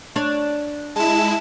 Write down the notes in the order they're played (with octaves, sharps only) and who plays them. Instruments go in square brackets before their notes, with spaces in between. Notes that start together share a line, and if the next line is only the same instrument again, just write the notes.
[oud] D4 C#5
[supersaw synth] G#3 E4 [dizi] A5